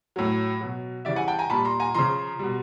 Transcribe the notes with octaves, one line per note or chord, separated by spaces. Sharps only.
A2 F#3
B2 F#3
C#3 E3 G3 D5 E5
F#5 G#5
G5 A5
G#5 A#5
A#2 G3 A5 B5
A#5 C6
G#5 A#5
C#3 F3 A#5 C6
B2 G3